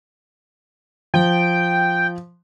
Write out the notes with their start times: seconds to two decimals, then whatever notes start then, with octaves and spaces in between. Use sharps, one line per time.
1.14 F3 G5